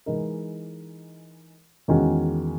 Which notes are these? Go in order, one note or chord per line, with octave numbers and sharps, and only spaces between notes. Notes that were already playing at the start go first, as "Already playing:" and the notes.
E3 G#3 D#4 A#4
E2 D#3 G#3 C#4 F#4